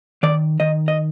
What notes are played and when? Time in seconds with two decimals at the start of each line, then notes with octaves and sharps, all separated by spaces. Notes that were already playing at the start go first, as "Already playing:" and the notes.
0.23 D#3 D5
0.60 D#3 D#5
0.88 D#5